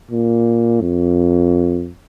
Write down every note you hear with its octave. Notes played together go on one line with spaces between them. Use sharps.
A#2
F2